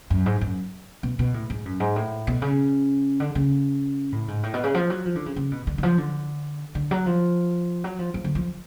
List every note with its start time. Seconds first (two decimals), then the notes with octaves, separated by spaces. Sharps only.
0.10 F#2
0.26 G#2
0.41 F#2
1.03 B2
1.19 B2
1.34 A2
1.50 G#2
1.65 F#2
1.80 G#2
1.96 A2
2.27 B2
2.42 C#3
3.20 D3
3.35 C#3
4.12 A2
4.28 G#2
4.43 A2
4.54 B2
4.64 C#3
4.74 F3
4.90 F#3
5.06 F3
5.16 D3
5.26 C#3
5.36 C#3
5.52 B2
5.67 D3
5.78 D3
5.83 F3
5.98 D3
6.75 D3
6.91 F#3
7.06 F3
7.84 F#3
7.99 F3
8.14 F3
8.24 D3
8.35 F3